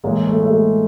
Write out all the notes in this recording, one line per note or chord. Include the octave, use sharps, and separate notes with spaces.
A2 E3 G#3 A#3
A3
A3
G#3